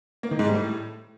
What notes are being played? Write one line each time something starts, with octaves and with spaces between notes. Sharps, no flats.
A#3
D#3
G#2
G3
A2